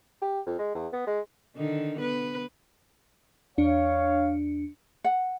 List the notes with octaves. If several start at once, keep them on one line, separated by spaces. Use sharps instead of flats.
G4
F2
G#3
E2
B3
G#3
D3 D#3 D#4
B3 B4
E2 D4 C#5 F5 C#7
F#5